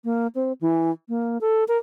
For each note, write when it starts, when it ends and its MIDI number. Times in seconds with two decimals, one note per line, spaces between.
0.04 0.27 58
0.35 0.52 60
0.61 0.91 52
1.09 1.40 58
1.41 1.64 69
1.68 1.77 70